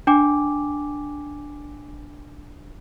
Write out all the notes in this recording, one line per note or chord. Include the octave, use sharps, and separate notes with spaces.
D4 G5 G#5 D6